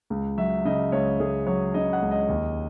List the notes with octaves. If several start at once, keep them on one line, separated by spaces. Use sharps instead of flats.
C#2
F#3 E5
C#3 D#5
C#2 C#5
C#2 G#4
F#3 C#5
C#3 D#5
F#5
C#2
D#5
D#2